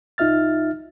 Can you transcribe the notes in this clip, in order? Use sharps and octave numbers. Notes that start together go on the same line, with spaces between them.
C2 D#4 F4 E5 F6 A6